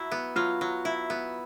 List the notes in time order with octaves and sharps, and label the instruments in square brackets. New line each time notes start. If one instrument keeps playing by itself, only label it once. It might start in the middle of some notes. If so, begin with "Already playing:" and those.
Already playing: [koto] F#3 E4
B3
[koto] F#3 [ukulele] F4
[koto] F#3
E4
B3